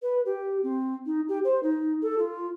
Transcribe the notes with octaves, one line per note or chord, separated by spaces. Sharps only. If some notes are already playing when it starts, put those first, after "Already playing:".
B4
G4
C4
D#4
G4
C5
D#4
A4
F4